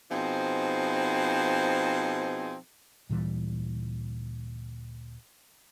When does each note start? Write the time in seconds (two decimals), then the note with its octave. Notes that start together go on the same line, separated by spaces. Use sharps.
0.11 B2 F3 C4 D#4 G#4
3.09 D2 A#2 E3 G3